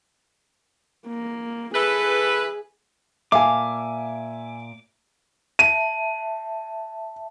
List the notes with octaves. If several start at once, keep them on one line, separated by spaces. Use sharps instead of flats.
A#3
E4 G#4 A4 B4
A#2 E5 F5 G#5 A5 D6
E5 A5 D#7